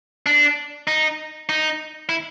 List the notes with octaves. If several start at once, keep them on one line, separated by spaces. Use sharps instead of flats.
D4
D#4
D#4
E4